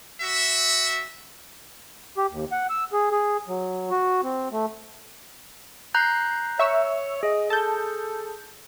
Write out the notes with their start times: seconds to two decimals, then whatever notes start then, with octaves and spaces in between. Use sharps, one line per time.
0.22 F#4 E5
2.17 G4
2.31 D#2
2.52 F#5
2.70 E6
2.93 G#4
3.11 G#4
3.48 F#3
3.91 F#4
4.23 C4
4.52 A3
5.94 A#5 F#6 G6 C7
6.59 C#5 E5 C#6 E6
7.23 G#4 D#5
7.50 A4 A5 G6